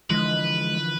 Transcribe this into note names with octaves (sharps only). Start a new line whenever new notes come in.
D3 E3 F3 G#3 B4